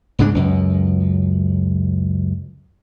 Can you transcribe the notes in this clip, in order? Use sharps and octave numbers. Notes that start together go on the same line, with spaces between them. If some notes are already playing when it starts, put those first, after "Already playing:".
C2 G#2 C#3 D4
C#2 F#2